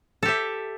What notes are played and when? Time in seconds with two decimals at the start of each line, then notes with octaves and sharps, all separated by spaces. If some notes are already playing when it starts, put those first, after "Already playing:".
0.23 A4
0.25 G4
0.28 E5